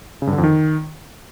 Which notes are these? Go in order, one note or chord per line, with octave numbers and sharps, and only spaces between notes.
C#3
G2
D3
F2
D#3